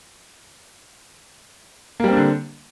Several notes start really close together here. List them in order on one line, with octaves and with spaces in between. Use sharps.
A#3 G3 C4 D4 D3